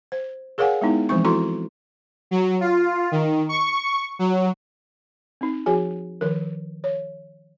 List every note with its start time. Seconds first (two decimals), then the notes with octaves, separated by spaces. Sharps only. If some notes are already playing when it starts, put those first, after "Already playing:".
0.12 C5
0.58 G#4 A#4 C#5 F5 F#5 G#5
0.81 G#3 B3 D#4 E4
1.09 E3 F3 G#3 C4 C#6
1.25 E4 F#4 A4 A#5 C6
2.31 F#3
2.61 F4
3.12 D#3
3.49 C#6
4.19 F#3
5.41 C4 D#4
5.66 F3 F#4 G#4 G#5
6.21 D#3 F3 A#4
6.84 C#5